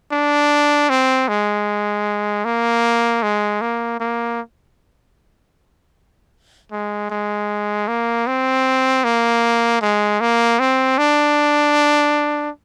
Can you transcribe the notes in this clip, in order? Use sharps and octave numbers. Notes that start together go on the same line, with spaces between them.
D4
C4
G#3
A#3
G#3
A#3
A#3
G#3
G#3
A#3
C4
A#3
G#3
A#3
C4
D4